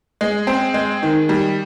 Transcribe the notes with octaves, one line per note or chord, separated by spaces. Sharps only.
G#3
C4
G#3
D#3
G3